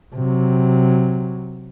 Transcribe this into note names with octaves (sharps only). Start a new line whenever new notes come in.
C3 F#3